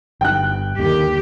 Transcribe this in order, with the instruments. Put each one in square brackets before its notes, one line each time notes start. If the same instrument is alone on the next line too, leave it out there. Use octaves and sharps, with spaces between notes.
[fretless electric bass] G1 G2 [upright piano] G5 F#6
[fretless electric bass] D#2 D3 G3 [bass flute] D#3 [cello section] G4